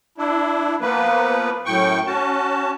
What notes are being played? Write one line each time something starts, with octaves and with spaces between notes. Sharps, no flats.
D4 E4
F3 A#3 B3 B4
F#2 A2 G5 C#6
C#4 F#4 A5